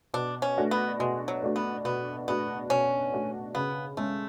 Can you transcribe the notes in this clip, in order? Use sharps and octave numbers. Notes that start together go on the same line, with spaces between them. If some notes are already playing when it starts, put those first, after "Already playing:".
B2 D4
C#4
A3 D4 F#4
B3
B2 G#3
F#3
A3 D4 F#4
B3
B2 B3
A3 B3 D4 F#4
B2 C#4
A3 D4 F#4
C#3 B3
G#3 A3 C#4